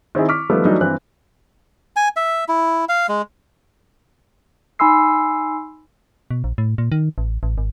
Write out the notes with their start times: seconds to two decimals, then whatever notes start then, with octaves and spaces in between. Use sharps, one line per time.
0.15 D#3 C4 E4 G#4
0.28 C#6 D6 F6 B6
0.50 D#3 F3 G3 A3 B3
0.65 E3 F#3 G3 A3 D4 D#4
0.81 G2 E3 C4 F#6
1.96 G#5
2.16 E5
2.49 E4
2.89 F5
3.09 G#3
4.79 D#4 G#5 B5 C6 E6 C7
6.31 B2
6.44 A#1
6.58 A2
6.78 A#2
6.92 D#3
7.18 A1
7.43 A1
7.58 G#1